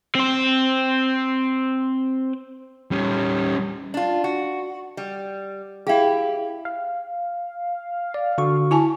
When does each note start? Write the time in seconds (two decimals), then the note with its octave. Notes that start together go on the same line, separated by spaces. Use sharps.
0.15 C4 C5
2.91 G3 C#4
3.94 D4 F4
4.24 F#4
4.97 G3
5.87 E4 G4 G#4 F5 G5
6.65 F5
8.14 D5
8.38 D3 F#4 C#6
8.71 E4 G#5 A5